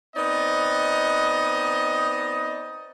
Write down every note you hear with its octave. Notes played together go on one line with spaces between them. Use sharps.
B3 C4 D#4 D5 D#5